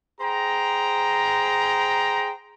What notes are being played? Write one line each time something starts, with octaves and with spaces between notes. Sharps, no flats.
G#4 C5 G5 A#5